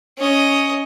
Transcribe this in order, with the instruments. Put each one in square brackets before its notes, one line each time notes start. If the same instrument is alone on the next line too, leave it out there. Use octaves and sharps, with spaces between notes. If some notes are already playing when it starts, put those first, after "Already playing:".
[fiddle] C#4 D#5